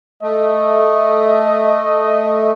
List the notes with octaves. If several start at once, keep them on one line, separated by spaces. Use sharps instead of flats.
A3 D#5